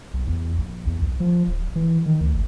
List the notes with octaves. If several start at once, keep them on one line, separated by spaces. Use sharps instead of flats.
B1
E2
A#1
E2
B1
F3
D1
E3
D#3
D2
G#1